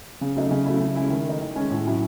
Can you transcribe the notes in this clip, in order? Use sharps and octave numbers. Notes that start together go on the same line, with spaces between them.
C#3
F#3 A3 D#4
C#3
F#3 A3 E4
C#3
G#3 C#4 E4
D#3
A3 D#4
D#3
G#3 C#4
A2
F#3 C#4 E4